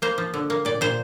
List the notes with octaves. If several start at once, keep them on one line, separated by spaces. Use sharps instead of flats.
A#3 C5
F3
D3
A#3
A#2 D5
A#2 C5